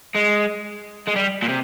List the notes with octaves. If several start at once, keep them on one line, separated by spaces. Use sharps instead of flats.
G#3
G#3
G3
A#2
C3